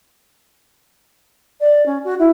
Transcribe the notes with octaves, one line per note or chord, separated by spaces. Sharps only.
D5
C#4
F#4
E4